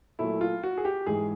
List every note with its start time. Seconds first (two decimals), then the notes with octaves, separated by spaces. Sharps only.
0.19 A#2 F#3 A3 E4
0.41 F4
0.63 F#4
0.78 G#4
0.85 G4
1.07 G#2 E3 G#3 G#4